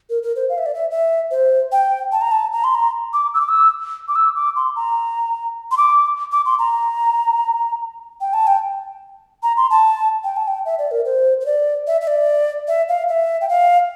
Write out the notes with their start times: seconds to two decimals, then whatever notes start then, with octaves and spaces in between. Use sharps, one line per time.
0.10 A#4
0.23 A#4
0.36 C5
0.49 F5
0.58 E5
0.66 D5
0.74 E5
0.91 E5
1.31 C5
1.72 G5
2.12 A5
2.21 A#5
2.32 A5
2.52 A#5
2.64 C6
2.75 A#5
3.13 D6
3.34 E6
3.41 D6
3.49 E6
4.08 D6
4.15 E6
4.36 D6
4.56 C6
4.76 A#5
5.71 C6
5.77 D6
6.32 D6
6.46 C6
6.59 A#5
8.21 G5
8.34 A5
8.47 G5
9.43 A#5
9.57 C6
9.70 A5
10.24 G5
10.37 A5
10.48 G5
10.65 E5
10.79 D5
10.91 A#4
11.05 C5
11.41 C5
11.46 D5
11.87 E5
12.01 E5
12.07 D5
12.68 E5
12.89 F5
13.09 E5
13.41 G5
13.49 F5